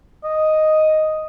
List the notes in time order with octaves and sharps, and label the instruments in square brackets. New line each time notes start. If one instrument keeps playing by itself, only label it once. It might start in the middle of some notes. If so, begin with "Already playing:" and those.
[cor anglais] D#5